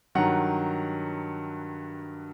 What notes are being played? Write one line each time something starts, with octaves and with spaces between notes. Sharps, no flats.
G2 D#3 F#3 F#5 A#5